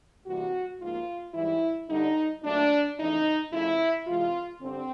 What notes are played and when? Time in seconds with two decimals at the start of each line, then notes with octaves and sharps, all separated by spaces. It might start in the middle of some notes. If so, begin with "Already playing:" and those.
0.26 C3 E3 G3 A#3 F#4
0.80 G#2 F3 A#3 F4
1.34 G#2 E3 G3 E4
1.88 G2 D3 G3 D#4
2.44 A#2 F#3 A3 D4
2.97 F2 C#3 E3 A3 D#4
3.52 F2 C#3 F3 A3 E4
4.06 C3 E3 G#3 F4
4.61 G2 D3 G3 C4